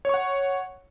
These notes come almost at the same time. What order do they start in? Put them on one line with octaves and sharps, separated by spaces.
C#5 C#6 F#5